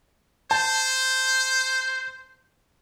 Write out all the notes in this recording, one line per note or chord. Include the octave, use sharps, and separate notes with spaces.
C5 A5